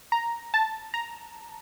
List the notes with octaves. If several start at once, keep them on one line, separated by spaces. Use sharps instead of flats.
A#5
A5
A#5